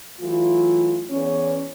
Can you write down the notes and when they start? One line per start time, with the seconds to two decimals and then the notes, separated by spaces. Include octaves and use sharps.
0.20 E3 F#3 A3 F4
1.10 E2 C#4